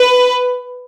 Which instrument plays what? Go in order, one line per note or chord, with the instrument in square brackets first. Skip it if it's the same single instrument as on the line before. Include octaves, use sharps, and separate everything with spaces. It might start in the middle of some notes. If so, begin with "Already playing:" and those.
Already playing: [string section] B4